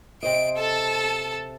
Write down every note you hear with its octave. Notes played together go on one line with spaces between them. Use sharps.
C3 C5 D#5 D7
A4 A5